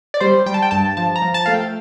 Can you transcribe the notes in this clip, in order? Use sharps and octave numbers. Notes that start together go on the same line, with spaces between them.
D5
G3 C5
G3 G5
A5
G5
G2 A5
F3 A5
A#5
F3
A5
A3 F5
G5